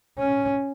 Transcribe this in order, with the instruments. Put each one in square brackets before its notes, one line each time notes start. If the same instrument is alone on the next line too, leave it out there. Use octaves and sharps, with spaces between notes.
[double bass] C#4